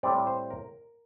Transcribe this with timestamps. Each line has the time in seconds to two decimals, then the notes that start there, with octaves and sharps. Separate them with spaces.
0.03 A2 G3 C4 D5
0.27 C5
0.50 A#4